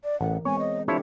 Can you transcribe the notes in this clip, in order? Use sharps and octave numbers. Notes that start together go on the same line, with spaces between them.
D5
A1 E3 A#4 F#5
G#3 B3 C4 C#5 G#5
D#5
F3 C4 D4 E4 G4 A4 C#5